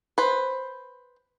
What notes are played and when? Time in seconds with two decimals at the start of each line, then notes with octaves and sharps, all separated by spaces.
0.18 B4 C5